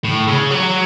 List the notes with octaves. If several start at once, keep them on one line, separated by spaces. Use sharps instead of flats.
A2
C#3
F#3